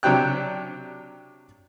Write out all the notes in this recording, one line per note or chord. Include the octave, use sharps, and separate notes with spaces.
C3 F#3 D4 G4 G5 F#6